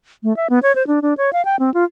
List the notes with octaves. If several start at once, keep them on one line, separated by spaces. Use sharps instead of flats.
A3
E5
B3
C#5
C5
D4
D4
C#5
F5
G5
C4
F4